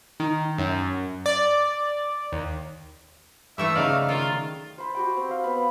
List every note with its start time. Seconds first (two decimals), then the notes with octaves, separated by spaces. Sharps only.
0.20 D#3
0.58 F#2
1.26 D5
2.32 D#2
3.58 G2 E3 A3 A4 E5
3.75 C#3 F#3 D#4 D5 F5
4.09 D#3 F4
4.78 C5 B5
4.95 F#4 G4 G5
5.17 C4
5.31 F5
5.44 B3 B5